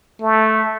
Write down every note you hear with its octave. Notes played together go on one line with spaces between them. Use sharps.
A3